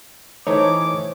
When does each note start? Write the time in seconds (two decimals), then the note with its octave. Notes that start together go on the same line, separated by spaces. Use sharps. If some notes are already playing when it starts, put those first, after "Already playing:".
0.47 E3 A3 D#4 C5 C#5 D6